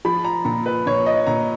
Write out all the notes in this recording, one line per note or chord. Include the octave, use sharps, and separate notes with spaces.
F3 B5
A#5
A#2 A#5
B4
A#2 C#5
D#5
A#2 A#5